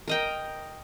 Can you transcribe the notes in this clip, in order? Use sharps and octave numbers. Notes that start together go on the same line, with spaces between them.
A#4 D#5 G5